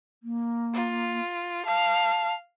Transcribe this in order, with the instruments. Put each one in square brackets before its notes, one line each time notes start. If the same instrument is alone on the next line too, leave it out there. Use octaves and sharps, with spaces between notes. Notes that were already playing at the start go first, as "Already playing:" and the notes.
[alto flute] A#3
[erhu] F4
[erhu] F5 [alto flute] A5